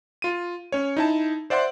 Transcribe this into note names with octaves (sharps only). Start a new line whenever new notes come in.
F4 D#7
C#4 C#5
D#4 E4 A5
C5 D5 E5 F#5 C6